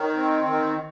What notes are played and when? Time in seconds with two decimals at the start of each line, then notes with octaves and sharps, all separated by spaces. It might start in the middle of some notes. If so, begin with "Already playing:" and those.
Already playing: D#3 C#5
0.16 C4
0.47 D#3